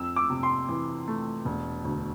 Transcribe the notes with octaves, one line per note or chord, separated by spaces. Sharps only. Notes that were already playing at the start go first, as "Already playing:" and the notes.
Already playing: F2 E6
D6
C3
C6
E3
A3
E1
D2